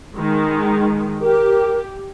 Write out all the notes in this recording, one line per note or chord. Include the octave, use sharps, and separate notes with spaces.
D#3 G#3
G4 A#4